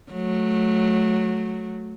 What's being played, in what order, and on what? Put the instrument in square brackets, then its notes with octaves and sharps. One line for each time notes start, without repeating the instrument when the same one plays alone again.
[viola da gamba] F#3 A3